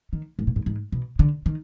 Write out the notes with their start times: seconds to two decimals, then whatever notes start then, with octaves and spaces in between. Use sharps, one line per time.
0.13 D#3
0.39 G#2
0.47 A#2
0.56 G#2
0.66 G#2
0.92 B2
1.19 D3
1.46 D#3